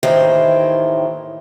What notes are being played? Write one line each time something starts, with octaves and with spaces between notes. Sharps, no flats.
D#2 A2 D#3 E3 C5